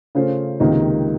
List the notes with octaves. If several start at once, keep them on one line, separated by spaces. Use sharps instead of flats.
C#3 A3 C#4 F4 C5
C#2 C3 D#3 A#3 D#4